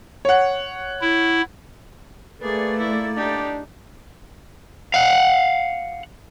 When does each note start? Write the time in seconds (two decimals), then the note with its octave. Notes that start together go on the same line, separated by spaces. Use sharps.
0.25 C#5 F#5
1.01 E4
2.42 A3 A#3 G#4 B4 D5
2.79 E4
3.17 D4 D#4 G4
4.94 F5 F#5